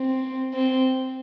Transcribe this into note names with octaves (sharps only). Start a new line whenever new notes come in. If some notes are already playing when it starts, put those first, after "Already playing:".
Already playing: C4
C4